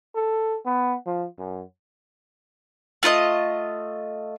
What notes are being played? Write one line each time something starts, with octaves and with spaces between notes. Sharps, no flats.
A4
B3
F3
F#2
A3 F4 B4 D#5